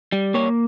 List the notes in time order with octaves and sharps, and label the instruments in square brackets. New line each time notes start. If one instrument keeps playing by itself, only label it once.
[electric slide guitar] G3
A#3 C#5